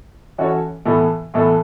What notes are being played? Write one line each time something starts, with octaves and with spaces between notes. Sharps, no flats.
E3 C#4 F#4 A4 C#5
A2 E3 B3 A4
A2 E3 B3 A4